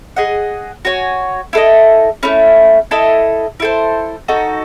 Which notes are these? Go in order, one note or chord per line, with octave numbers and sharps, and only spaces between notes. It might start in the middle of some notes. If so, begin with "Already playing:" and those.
G#4 D#5 F#5
F#4 C#5 G#5
E4 A4 D#5
A3 C#4 E4
E4 A4 D#5
E4 A4 C5
D#4 F#4 A4